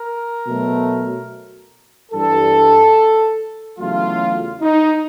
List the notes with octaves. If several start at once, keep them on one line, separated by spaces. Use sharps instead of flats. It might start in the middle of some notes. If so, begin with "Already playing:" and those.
Already playing: A#4
B2 F#3 A3
G2 E3 G3 A4
E2 C#3 F#3 A3 F4
D#4